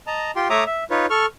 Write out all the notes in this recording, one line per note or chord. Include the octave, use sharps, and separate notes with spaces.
D#5 A5 A#5
F4 G4 G5 C6
A3 C#5 E5 A#5 D6 D#6
E5
D#4 F4 B4 C#5
A4 C#6 F6